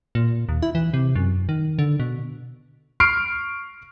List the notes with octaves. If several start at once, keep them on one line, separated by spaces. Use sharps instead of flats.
A#2
D#2
E4
E3
C3
F#2
D#3
D3
B2
C#6 F6 C7 D7